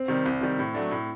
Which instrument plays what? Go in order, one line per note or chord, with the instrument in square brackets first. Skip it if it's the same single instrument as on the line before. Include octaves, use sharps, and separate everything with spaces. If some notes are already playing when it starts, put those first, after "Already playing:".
Already playing: [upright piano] C4
[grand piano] C3 D#3 G3
C2
C3 D#3 G3
A2
F#3 A3 D4
A2